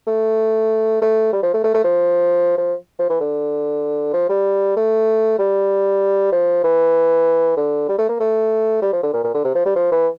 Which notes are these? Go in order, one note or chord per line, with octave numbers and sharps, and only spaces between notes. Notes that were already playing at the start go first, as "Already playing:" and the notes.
A3
A3
G3
F3
A3
A3
A3
F3
F3
F3
E3
D3
F3
G3
A3
G3
F3
E3
D3
G3
A3
A#3
A3
G3
F3
D3
A#2
A#2
D3
C3
F3
G3
F3
E3